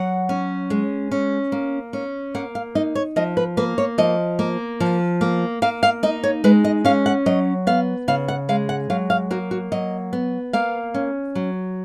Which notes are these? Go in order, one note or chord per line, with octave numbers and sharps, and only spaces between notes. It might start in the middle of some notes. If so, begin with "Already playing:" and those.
Already playing: F#3 F#5
C#4
G#3
C#4
A#3
C#4
A#3 F#5
F5
D#4 D#5
C#5
F3 D#5
B4
A#3 B4
C#5
F3 D#5
A#3
F3
A#3
A#3 F5
F5
D#4 D#5
C#5
G#3 B4
D#5
C#4 F5
F#5
F#3 D#5
B3 F5
C#3 F5
F#5
G#3 F5
F#5
F#3 F5
F5
A#3 F#4
F#4
F#3 D#5
B3
A#3 F5
C#4
F#3